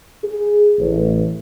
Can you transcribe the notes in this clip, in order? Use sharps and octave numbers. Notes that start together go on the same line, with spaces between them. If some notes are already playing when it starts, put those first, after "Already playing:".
G#4
A1